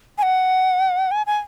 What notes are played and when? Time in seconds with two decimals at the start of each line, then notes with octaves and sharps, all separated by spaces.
0.18 G#5
0.23 F#5
1.11 G#5
1.27 G#5